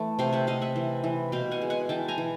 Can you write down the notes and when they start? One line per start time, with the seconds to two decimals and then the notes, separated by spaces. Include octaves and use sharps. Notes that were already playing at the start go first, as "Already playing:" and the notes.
Already playing: E3 A3
0.19 C3 F5 G5
0.33 E5 F#5
0.47 C3 D#5 F5
0.62 E5 F#5
0.76 E3
1.04 E3
1.32 B2 F5 G5
1.51 F#5 G#5
1.61 G#3
1.70 F#5 G#5
1.89 E3 G5 A5
2.08 G#5 A#5
2.18 E3